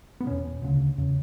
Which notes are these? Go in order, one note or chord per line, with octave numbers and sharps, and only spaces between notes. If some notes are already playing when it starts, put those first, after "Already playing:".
B3
E2 B2 C#4
D2 C#3
E2 C#3